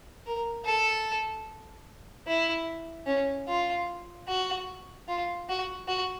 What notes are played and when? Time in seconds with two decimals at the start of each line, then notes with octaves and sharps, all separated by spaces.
0.26 A#4
0.65 A4
2.27 E4
3.06 C#4
3.48 F4
4.28 F#4
5.08 F4
5.49 F#4
5.88 F#4